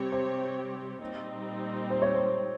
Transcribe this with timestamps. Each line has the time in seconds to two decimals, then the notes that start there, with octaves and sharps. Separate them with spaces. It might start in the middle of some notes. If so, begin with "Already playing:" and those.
Already playing: C3 G3 C4 G4 C#5
0.12 C5
1.01 A#2 G3 C4 D#4
1.90 C5
2.02 C#5
2.15 C5